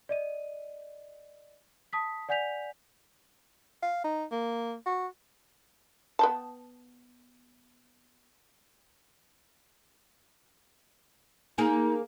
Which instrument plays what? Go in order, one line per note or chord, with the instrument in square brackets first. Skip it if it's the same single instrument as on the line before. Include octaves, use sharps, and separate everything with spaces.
[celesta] D5 D#5 D#7
A5 D#6 B6
D5 F#5 G#5 G6 B6 F7
[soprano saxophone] F5
D#4
A#3
F#4
[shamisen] B3 G5 A5
[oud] A#3 G#4 [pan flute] D#4